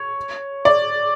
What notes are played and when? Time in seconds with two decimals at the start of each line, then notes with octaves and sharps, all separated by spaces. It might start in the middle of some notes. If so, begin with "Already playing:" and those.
Already playing: C#5
0.65 D5